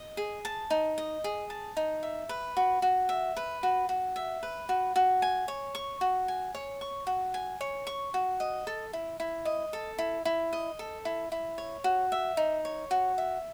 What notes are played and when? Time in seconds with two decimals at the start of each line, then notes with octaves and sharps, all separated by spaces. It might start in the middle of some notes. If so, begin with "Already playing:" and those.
Already playing: D#5
0.17 G#4
0.45 A5
0.70 D#4
0.98 D#5
1.24 G#4
1.50 A5
1.77 D#4
2.03 E5
2.29 B4
2.57 F#4
2.82 F#4
3.09 E5
3.37 B4
3.63 F#4
3.89 F#4
4.16 E5
4.43 B4
4.69 F#4
4.96 F#4
5.22 G#5
5.48 C#5
5.75 C#6
6.01 F#4
6.28 G#5
6.55 C#5
6.81 C#6
7.07 F#4
7.34 G#5
7.61 C#5
7.87 C#6
8.14 F#4
8.40 D#5
8.67 A4
8.93 E4
9.20 E4
9.45 D#5
9.73 A4
9.98 E4
10.25 E4
10.53 D#5
10.79 A4
11.05 E4
11.32 E4
11.58 C#5
11.84 F#4
12.12 E5
12.37 D#4
12.65 C#5
12.91 F#4
13.18 E5